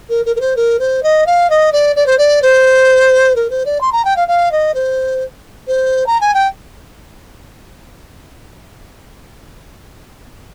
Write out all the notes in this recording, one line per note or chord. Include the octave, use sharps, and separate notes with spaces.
A#4
A#4
A#4
C5
A#4
C5
D#5
F5
D#5
D5
D5
C5
D5
C5
A#4
C5
D5
C6
A#5
G5
F5
F5
D#5
C5
C5
A#5
G#5
G5